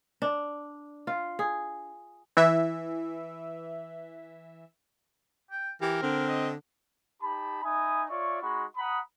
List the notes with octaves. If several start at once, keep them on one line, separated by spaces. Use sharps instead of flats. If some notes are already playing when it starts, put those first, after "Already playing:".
D4
F4
G#4
E3 E5
G5
E3 G4 A#4
D3 C4
D#5
D#4 G4 A5 B5
D#4 E5 G#5 B5 D#6
F4 C#5 D5 E5 C#6
G#3 D#4 F#4 B5 C#6
F#5 A#5 B5 D#6